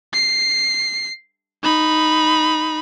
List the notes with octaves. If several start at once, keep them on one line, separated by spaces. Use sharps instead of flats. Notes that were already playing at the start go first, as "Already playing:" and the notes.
C7
D#4 B5